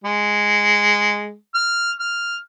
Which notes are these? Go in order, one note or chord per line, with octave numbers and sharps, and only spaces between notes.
G#3
F6
F6